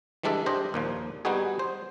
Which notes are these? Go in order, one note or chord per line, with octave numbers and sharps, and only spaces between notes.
E3 G3 G#3 D4 A4 E5
D4 G4 C5 D#5
D#2 A#2 F3
G3 B3 D#4 F#4 G#4
C5